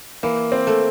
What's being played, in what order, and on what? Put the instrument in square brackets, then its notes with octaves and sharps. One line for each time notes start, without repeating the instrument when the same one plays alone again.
[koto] E3 [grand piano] A#3
[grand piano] C4
[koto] A3